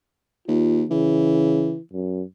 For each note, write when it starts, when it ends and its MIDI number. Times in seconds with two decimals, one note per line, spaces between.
0.48 0.85 39
0.48 0.83 65
0.91 1.76 49
0.91 1.79 52
1.93 2.23 42